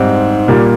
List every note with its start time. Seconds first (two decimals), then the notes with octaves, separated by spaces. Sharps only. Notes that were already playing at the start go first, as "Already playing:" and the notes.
Already playing: G#2 G3 C4
0.48 A#2 G3 A#3